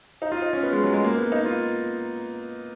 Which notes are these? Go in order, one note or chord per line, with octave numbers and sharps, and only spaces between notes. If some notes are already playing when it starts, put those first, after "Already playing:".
D#4
F4
D#4
C#4
B3
G#3
F#3
G#3
A#3
B3
D#4
F4